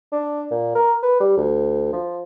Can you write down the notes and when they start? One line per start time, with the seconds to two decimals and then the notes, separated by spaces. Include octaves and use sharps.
0.12 D4
0.51 A#2
0.75 A#4
1.03 B4
1.20 G3
1.37 D2
1.93 F3